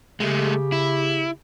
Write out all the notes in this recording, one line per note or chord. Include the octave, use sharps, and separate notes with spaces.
C#3 G#3 A3 G4
E4